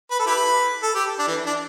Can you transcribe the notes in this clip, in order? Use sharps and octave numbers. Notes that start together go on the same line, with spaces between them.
B4
A4
E4 G4 B4
A4
G4
D4
E3
D4